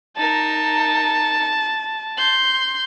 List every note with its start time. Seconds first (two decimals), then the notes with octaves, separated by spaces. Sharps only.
0.17 D#4 A#4 A5
2.17 C6 G6